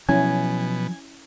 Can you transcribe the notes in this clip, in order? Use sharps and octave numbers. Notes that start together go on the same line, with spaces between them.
B2 F3 F#3 C#4 E4 G#5